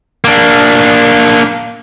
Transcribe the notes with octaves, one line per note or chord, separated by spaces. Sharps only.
A#3 D4